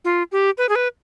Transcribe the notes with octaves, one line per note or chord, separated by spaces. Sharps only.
F4
G4
B4
G#4
B4